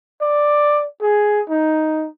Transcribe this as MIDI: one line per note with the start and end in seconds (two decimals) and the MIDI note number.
0.21 0.84 74
1.01 1.41 68
1.50 2.07 63